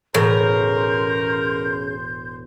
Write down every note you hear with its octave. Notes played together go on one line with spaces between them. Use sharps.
E1 A2 C#3 A#4 C6 G6 A#6